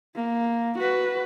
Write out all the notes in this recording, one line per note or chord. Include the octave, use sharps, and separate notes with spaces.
A#3
F#4 B4